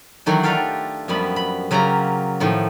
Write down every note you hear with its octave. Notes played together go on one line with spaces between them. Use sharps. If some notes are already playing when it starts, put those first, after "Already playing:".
D#3 E3 F#3 A3 D4
D4 F4 G4 A4 F5 G5
F#2 F3 G3 B3 B5
B5
C#3 F#3 A#3 F4 G4 A#5
A2 D#3 F3